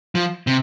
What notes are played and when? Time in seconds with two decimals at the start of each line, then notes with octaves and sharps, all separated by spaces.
0.15 F3
0.47 C3